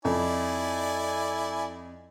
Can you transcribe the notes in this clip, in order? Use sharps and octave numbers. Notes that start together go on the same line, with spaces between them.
F2 E4 D5 G#5